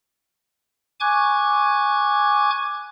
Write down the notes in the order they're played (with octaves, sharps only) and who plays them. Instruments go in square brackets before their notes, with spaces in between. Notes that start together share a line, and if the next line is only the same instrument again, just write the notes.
[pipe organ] G#5 C#6 D6 F#6 G#6